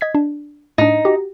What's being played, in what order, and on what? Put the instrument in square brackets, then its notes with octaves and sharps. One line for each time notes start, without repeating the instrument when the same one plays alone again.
[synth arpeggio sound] D#5 G#6 B6
D4
[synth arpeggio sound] A2 D4 [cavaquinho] D#4
[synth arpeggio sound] F#4 G4